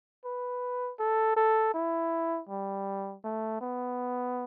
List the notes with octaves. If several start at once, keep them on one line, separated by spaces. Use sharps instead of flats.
B4
A4
A4
E4
G3
A3
B3